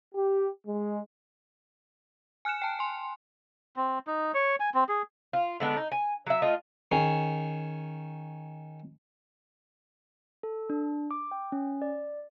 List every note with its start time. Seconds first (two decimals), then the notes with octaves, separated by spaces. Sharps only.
0.14 G4
0.67 G#3
2.45 G#5 F6 F#6 C#7 E7
2.62 G5 A5
2.79 G#5 C6
3.76 C4
4.07 D#4
4.34 C#5
4.60 G#5
4.74 C4
4.89 G#4
5.33 F4
5.60 D3 G#3 B3 D4
5.77 D#4
5.92 G#5
6.26 F#3 E5
6.42 A3 F4 D#5
6.91 D#3 C#4 G#4
10.43 A4
10.70 D4
11.11 D6
11.31 G5
11.52 C#4
11.82 D5